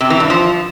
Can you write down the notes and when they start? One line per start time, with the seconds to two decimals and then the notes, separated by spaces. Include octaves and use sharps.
0.01 C3
0.10 E3
0.20 G2
0.30 F3